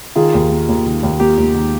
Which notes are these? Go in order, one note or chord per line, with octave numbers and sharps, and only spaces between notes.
D#3 F4 G#4
D#2
A#3
D#2
D#3
D#2
A#3 G4
D#2
D#3